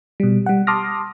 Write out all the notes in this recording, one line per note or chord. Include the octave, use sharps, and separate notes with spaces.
B2 G3
G3 F#5
A5 C6 D6 D#6 F6 A#6